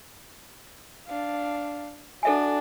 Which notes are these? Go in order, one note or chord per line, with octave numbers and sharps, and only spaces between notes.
D4 F5
D4 F#4 A4 E5 G#5